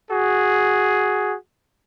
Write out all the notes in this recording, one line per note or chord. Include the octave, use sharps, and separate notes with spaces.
F#4 G#4